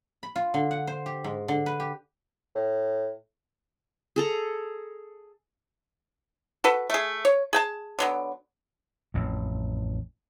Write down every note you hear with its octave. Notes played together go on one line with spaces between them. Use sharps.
B5
F4
D3
F#5
C5
G4
G#2
D3
B4
G4
A2
G#4 A4 A#5
F#4 A4 B4
A3 G#4
C#5
G#4 G5 A5
D3 F#3 B3
A1 F2